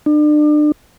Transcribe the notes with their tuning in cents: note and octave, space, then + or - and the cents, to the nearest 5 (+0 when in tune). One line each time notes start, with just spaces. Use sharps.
D4 +35